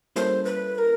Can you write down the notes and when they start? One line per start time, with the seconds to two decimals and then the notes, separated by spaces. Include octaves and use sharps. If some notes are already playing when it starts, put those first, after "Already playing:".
0.16 G3 A#3 C#4 E4 A4 C5
0.45 B4
0.75 B4
0.78 A#4